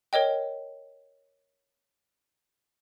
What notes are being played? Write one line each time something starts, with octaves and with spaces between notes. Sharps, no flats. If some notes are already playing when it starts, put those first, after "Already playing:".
A#4 C#5 D#5 G5